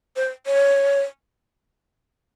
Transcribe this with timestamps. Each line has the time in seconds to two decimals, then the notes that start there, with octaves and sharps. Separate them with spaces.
0.16 C5
0.47 C#5